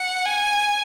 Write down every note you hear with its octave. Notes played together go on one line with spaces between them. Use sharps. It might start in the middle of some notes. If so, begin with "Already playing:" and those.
Already playing: F#5
G#5